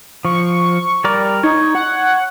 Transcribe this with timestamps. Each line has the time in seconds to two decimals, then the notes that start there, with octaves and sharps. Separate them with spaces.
0.25 F3 C#6
1.04 G3 A#4 D5
1.43 D#4 C#5
1.75 F#5